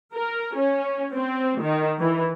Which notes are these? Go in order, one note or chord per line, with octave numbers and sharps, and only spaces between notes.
A#4
C#4
C4
D#3
E3